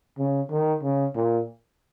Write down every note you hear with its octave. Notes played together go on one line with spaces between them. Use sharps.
C#3
D#3
C#3
A#2